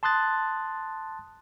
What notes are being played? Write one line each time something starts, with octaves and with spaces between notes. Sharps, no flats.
A5 C6 D#6 F#6 A6